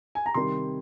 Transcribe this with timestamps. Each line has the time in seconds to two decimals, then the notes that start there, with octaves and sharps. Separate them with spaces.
0.15 G#5
0.26 A#5
0.34 C3 D#3 G3 C6